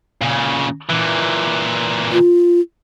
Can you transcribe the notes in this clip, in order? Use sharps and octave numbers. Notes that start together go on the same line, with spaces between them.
A#2 C#3
A#2 E3
F4